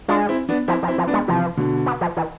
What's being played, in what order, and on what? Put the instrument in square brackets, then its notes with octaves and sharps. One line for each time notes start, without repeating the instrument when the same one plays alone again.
[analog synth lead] G#3 [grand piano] D4 F4
[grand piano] C4 E4
B3 D4
[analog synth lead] F3 [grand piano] C4 E4
[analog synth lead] F3
[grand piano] C4 E4
[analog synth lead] F3
[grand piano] B3 D4
[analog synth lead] G#3
[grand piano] C3 E3 [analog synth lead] F3
[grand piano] B2 D3
[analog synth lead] B3
F3
E3